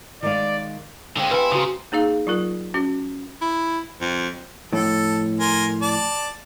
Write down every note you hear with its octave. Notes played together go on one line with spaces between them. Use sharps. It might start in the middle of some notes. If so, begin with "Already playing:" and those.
D#3 G#3 D5 F5
D3 G#3 C4 F4 G4
E4 G#4 B4 G5
C#3 F#4 A#5 D#6
A#3 D#4 G#4 F5
F#3 F4 A#4
C#4 F#4
E4
F2
F2 A2 A4
A#4 G#5 C6
D5 A5